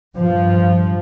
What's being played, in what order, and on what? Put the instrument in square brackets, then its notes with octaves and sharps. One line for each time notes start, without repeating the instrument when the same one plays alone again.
[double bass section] G2 F3